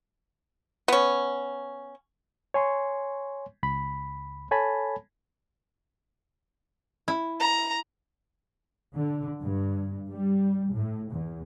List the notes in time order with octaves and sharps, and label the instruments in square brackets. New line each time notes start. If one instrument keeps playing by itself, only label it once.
[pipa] B3 C#4
[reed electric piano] C#5 G#5 C6 C#6
C#2 B5
A4 C#5 G#5 A5 B5
[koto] E4
[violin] A#5
[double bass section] D3
G2
G3
A2
E2